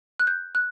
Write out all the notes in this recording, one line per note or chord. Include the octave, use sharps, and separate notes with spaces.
F#6
G6
F#6